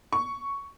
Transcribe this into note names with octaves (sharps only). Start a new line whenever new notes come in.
C#6